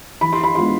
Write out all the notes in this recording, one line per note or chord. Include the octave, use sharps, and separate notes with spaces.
E3 B5
C6
B5
G#3 B3 D4 F4 C6